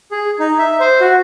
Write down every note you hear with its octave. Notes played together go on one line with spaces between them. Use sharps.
G#4
D#4
E5
C5
F#4